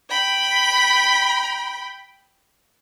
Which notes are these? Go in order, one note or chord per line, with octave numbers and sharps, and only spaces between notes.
G5 B5